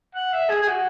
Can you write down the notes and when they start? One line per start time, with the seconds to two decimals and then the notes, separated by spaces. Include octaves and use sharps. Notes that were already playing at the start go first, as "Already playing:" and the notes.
0.15 F#5
0.33 E5
0.50 G#4
0.63 G#4
0.68 F#4